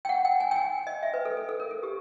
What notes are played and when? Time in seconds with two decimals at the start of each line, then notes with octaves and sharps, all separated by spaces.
0.05 G5
0.09 F#5
0.25 G5
0.40 G#5
0.51 G5
0.56 G#5
0.87 D#5
1.03 E5
1.14 B4
1.25 A4
1.37 A4
1.49 A4
1.60 A#4
1.71 A4
1.83 G4